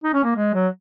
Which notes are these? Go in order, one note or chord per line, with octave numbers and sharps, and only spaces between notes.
D#4
C#4
A#3
G#3
F#3